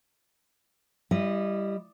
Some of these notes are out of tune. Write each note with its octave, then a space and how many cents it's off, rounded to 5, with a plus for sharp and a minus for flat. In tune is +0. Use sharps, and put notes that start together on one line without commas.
G3 +0 E4 +25 D#5 -15